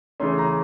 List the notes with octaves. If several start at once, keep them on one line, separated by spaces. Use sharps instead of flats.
C#3 E3 A3 C#4 C6
A#5